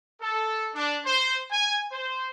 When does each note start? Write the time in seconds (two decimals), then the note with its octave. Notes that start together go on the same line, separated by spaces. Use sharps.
0.22 A4
0.74 D4
1.06 C5
1.52 G#5
1.92 C5